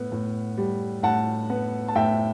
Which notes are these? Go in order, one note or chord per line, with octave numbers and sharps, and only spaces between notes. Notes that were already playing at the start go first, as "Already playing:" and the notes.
Already playing: A2 B3
A2
G3
A2 F#5 A5
B3
A5
A2 E5 G5